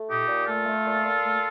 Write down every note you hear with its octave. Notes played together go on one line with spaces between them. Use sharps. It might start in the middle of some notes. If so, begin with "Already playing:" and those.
Already playing: A3
A#2 D#4 G4
A#2
A3 F4 A4
A3
A#2
A#2
A3